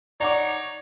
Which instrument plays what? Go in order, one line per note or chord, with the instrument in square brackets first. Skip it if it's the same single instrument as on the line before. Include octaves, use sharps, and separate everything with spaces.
[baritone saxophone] D#4 [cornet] C#5 [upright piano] D5 F#5 D6